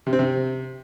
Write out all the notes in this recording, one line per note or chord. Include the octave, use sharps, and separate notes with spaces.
C3
C4
C3